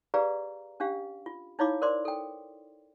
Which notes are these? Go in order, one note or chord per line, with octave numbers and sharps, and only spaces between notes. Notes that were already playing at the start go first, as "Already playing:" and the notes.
G4 G#4 B4 D5 F5 A#5
C#4 D4 G4 F5
F4
D#4 E4 C#5 F5 B5 D6
A#4 C5 D5 C6 D6
A4 G5